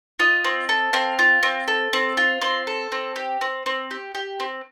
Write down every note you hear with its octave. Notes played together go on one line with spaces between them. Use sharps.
F4 D#5
C4
A4
C4 F5
F4
C4
A4
C4
F4
C4 C6
A4
C4
G4
C4
C4
G4
G4
C4